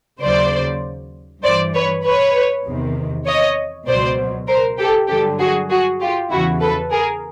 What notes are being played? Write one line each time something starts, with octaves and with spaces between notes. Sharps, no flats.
D#2 C#3 F#3 C5 D5
G2 E3 C5 D5
B4 C#5
B4 C#5
E2 C3 D#3
C#5 D#5
C#2 B2 F#3 C5 D5
A#4 C5
G4 A4
G2 D3 F#3 G4 A4
F#4 G#4
F#4 G#4
F4 G4
E2 C#3 E3 E4 F#4
A4 B4
G#4 A#4